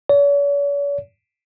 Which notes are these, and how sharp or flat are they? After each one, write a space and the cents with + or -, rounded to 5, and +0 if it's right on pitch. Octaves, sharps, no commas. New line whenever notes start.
C#5 +45